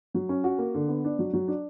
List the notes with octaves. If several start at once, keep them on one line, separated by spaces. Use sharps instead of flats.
F#3
C#4
F#4
A#3
D3
B3
D4
F#3
F#3
D4